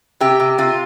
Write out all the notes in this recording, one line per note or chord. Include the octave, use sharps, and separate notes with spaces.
C3 G4
C3
C3 F4